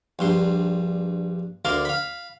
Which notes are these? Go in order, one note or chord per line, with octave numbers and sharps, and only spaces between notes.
A#1 G2 C6
D2 A#3 A#4 D5 C6 D6
F5 B5